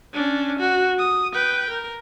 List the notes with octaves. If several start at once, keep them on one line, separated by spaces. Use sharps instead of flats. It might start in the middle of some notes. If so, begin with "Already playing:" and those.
C#4 D4
F#4
D#6
B4 G5
A#4